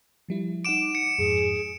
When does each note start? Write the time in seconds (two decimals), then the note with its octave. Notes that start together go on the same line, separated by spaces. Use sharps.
0.29 F3 G3 E4
0.65 D#4 F#5 D6 D7 E7
0.95 C#7
1.18 F2 G#2 G#4